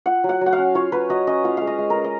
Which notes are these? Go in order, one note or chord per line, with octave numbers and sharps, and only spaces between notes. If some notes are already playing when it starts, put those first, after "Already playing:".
F4 F#5
F#3
F#5
F#3
F#5
F5
C#4
F4 C#5
F#3 B4
F#3 D#5
C#4 D#5
F4 F5
G#3 F5
D#5
G#3
A#4
C#4
D#5